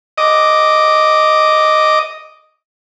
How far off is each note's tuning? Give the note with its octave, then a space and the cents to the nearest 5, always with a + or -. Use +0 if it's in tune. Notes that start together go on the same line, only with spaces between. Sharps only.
D#5 +0 D6 +0